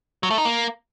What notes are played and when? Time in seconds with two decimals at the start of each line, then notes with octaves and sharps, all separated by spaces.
0.23 F#3
0.30 A3
0.38 D#4
0.45 A#3